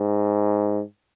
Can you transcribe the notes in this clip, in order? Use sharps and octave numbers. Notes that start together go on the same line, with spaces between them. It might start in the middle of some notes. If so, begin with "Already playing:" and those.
Already playing: G#2